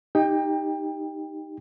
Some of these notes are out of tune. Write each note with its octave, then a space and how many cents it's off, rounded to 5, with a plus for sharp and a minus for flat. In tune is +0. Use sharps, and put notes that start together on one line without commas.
D#4 +0 G4 +5 G5 +25